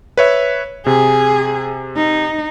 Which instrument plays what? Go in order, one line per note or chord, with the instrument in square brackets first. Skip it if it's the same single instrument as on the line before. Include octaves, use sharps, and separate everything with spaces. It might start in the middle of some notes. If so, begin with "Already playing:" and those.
[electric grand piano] B4 C#5 E5
[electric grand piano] C3 [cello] G#4
[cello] D#4